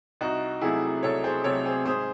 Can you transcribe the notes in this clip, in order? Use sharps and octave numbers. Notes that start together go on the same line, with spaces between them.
C2 D#4 F#4
C3 F#3 A3 E4 G#4
C2 A4 C#5
G#4 C5
C3 F#3 A3 A4 C#5
G#4 C5
G#2 G#4 C5